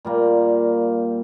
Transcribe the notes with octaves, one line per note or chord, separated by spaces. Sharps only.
A#2 G3 A#3